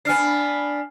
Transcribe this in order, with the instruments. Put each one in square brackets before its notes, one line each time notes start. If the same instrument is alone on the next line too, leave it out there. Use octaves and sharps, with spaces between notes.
[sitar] B3 D4 [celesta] G#5 F6 C7